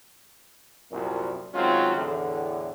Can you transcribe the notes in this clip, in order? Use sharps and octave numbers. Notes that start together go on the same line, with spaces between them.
C2 F#2 A#2
D#3 F#3 G#3 C4 C#4 F4
E2 A2 D3